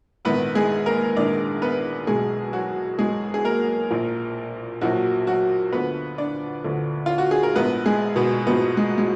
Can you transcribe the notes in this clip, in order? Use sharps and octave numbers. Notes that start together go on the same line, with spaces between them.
A#1 G#2 D#3 B3 B4
G#3 G#4
A#3 A#4
A#1 G#2 D#3 D4 D5
B3 B4
B1 B2 G#3 G#4
F#3 F#4
B1 B2 G#3 G#4
G#4
A#3 A#4
A#1 A#2 F3
A#1 A#2 F3 F#3 F#4
F#3 F#4
D2 D3 F3 B3 B4
D4 D5
D2 D3 F3
F4
F#4
G#4
A#4
A#1 G#2 F3 B3 B4
G#3 G#4
B2 B3
A#1 G#2 B2 F3 B3
G#3
G#3